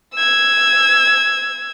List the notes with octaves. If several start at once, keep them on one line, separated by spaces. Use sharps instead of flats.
E6 G#6